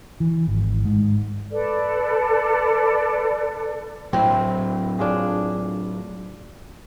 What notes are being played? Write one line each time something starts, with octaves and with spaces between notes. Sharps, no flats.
E3
G#1
G#2
A4 B4 D5
A2 F#3 C4 E4
D4 F4 G#4